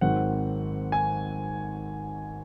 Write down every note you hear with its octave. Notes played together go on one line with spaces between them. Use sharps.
G#1 G#2 F#3 C4 F#5
G#5